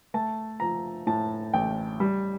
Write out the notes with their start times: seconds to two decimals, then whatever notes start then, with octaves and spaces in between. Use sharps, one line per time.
0.14 A3 A5
0.60 F3 A#5
1.07 A2 A5
1.53 A1 G5
2.00 G3